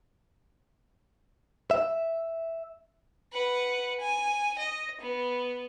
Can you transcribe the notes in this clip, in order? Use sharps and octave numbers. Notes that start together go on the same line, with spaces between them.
E5
B4 F#5
G#5
D#5
B3